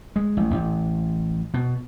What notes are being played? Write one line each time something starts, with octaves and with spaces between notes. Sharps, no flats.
G#3
A1
A1
B2